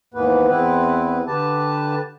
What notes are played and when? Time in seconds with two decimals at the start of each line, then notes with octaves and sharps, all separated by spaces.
0.14 D#2 G#2 E3 A#3 B3 B4
0.48 E2 B3 C4 E4 B4
1.27 D3 G4 B4 A5